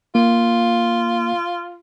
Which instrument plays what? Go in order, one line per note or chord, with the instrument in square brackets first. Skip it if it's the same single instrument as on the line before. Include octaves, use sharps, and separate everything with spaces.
[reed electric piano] A#3 [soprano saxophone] F4